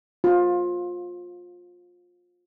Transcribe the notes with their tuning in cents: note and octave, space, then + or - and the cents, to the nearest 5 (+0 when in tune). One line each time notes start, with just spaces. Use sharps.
F4 +20